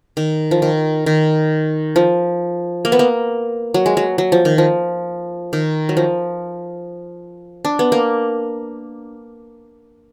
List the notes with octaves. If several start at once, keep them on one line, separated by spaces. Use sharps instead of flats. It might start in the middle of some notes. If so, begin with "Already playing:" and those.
D#3
F3
D#3
D#3
F3
A#3
B3
A#3
F#3
G#3
F#3
F#3
F3
D#3
F3
D#3
F#3
F3
D4
B3
A#3